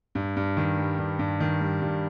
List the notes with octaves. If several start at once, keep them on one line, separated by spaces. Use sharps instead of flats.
G2
G2
D#3
G3
G2
G2
D#3
G3
G2